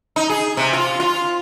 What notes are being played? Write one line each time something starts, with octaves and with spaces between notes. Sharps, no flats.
D#4
G#4
C3
F4
F4